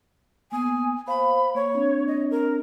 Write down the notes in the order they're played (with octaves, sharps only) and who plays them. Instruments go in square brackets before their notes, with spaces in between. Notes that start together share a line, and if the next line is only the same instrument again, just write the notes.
[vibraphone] A#3 B3 D#6 [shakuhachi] G#5
[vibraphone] C5 F5 [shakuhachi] B5
[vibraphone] A#3 [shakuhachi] C#5
[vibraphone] C4 D4
[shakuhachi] D#5
A#4